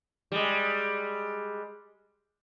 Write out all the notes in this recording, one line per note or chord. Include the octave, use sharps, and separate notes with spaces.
G3 G#3